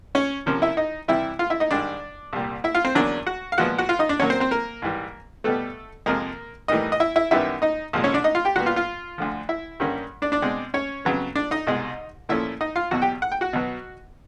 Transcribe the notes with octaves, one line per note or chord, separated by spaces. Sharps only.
C#4 C#5
C3 F3 A#3 C#4
E4 E5
D#4 D#5
C3 E3 G3 E4 E5
F4 F5
E4 E5
D#4 D#5
G#2 D#3 G3 D4 D5
C2 A#2 G3
E4 E5
F4 F5
C4 C5
E2 C#3 F#3 A#3 C#4 D4 D5
F#4 F#5
F5
A#2 F3 G#3 B3 F#4 F#5
F#4 F#5
F4 F5
D#4 D#5
D4 D5
A#2 F#3 A#3 C#4 C#5
C4 C5
C4 C5
A#3 A#4
G#2 E3 G3
B2 G3 A3 B3 A4
F2 C3 F3 G#3 A#3 A#4
A2 E3 G3 A#3 D#4 D#5
D#5
E4 E5
E4 E5
F#2 D#3 G3 B3 E4 E5
D#4 D#5
C2 A#2 F3 G#3
C#4 C#5
D4 D5
D#4 D#5
F4 F5
G4 G5
A#2 G3 B3 F#4 F#5
F4 F5
F4 F5
D2 D3 F3
E4 E5
G2 D3 G3 A#3 C#4
D4 D5
D4 D5
B2 G#3 C4
C#4 C#5
F2 C#3 F#3 B3
D4 D5
D#4 D#5
C2 B2 G#3
A#2 F3 A3 C#4 E4 E5
D#4 D#5
F4 F5
E2 B2 F#3 F#4 F#5
G4 G5
F#5
G5
F#4 F#5
B2 F#3 B3